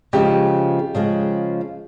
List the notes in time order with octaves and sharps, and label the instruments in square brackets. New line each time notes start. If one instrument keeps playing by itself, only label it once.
[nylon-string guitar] C#3 F3 G#3 [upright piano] G4
[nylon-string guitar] C#3 F3 G#3